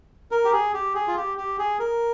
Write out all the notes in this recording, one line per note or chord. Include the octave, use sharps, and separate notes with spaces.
A#4
G4
G#4
G4
G#4
F4
G4
G4
G#4
A#4